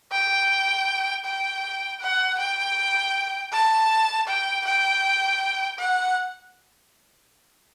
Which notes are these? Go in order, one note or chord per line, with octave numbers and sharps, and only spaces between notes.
G5
G5
F#5
G5
A5
G5
G5
F#5